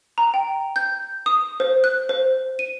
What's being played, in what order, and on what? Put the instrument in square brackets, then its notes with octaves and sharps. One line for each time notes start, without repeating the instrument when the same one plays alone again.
[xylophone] A#5
G5
G6
D#6
C5
F#6
C5
D#7